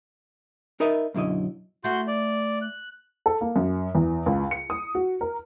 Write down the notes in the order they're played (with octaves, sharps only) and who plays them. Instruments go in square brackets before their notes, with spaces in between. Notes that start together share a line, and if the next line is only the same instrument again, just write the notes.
[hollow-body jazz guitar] D#4 A#4 B4 D#5 E5
B1 F#2 D3 E4 D#5
[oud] A3 E4 [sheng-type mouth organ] F#4 C6 G6
[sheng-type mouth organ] D5
F#6
[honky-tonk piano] A4
A#3
F#2
E2
C#2
C#7
D#6
F#4
A#4